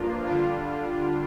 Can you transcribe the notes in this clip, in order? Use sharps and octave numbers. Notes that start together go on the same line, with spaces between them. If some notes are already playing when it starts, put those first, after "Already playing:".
Already playing: G2 F3 A#3 D4 F4
D3 G3 D4 F4